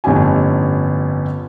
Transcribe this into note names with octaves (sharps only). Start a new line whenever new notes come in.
G1 F2 A2 C#4 G4 G#5